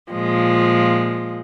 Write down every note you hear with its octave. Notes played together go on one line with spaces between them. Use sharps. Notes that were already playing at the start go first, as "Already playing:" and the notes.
A#2 F3 G#3